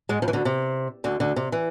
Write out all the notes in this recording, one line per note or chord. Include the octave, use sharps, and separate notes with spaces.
G#2 G#3
F2 F3
E3
D2 D3
C3
D2 D3
D2 D3
C3
E3